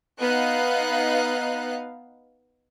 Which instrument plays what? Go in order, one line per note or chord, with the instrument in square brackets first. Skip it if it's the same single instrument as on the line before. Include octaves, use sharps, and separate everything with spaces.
[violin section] B3 D#4 F5 F#6